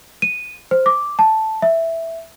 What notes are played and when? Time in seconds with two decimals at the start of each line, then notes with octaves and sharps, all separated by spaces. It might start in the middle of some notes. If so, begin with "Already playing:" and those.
0.22 D#7
0.71 C5
0.86 D6
1.19 A5
1.62 E5